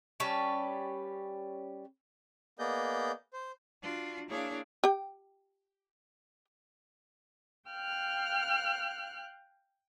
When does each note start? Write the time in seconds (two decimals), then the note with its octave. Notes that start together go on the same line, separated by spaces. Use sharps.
0.20 G3 C#4 B4 A5
2.59 A#3 B3 G#4 D5 D#5 G6
3.33 C5
3.82 D4 F4 F#4
4.28 A#3 D4 E4 G#4 C#5 F5
4.84 G4 G5
7.68 F5 G5 F6 F#6